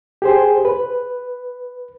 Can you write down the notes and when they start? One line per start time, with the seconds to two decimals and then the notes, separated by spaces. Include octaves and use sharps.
0.22 G4 G#4 C5
0.65 B4